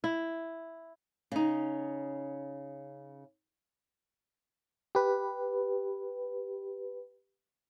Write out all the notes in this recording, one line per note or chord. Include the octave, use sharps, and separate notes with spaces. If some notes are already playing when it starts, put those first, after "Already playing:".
E4
C#3 D#4
G4 B4